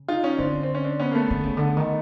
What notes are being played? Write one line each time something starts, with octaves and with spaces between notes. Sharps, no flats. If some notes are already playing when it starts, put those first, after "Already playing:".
Already playing: C#3
D#4 F4
C#4 D#4
D3 C4 D4
C4
C#4
C4 D4
B3 C#4
A#3
A3 B3
D3
C#3
D3
D#3